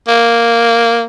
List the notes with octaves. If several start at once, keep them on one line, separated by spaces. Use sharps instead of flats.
A#3